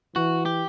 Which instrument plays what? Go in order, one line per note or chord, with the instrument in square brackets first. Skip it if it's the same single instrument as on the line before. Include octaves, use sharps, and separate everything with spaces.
[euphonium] E3 [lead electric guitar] F#4
[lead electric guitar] G4